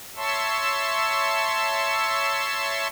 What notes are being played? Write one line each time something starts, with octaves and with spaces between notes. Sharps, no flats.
C#5 E5 A5 C6 C#6 E6